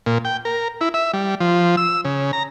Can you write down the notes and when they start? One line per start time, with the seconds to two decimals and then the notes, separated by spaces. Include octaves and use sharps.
0.06 A#2
0.25 G5
0.45 A#4
0.81 E4
0.94 E5
1.13 G3
1.40 F3
1.77 E6
2.05 C#3
2.33 A#5